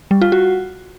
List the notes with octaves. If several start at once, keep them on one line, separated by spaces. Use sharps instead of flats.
G3
F4
F#4